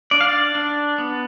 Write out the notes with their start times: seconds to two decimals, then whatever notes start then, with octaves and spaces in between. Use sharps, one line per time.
0.11 D4 D5
0.21 F5
0.29 D5
0.55 D4
0.98 B3